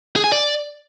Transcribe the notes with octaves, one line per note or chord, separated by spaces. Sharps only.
G#4
G#5
D5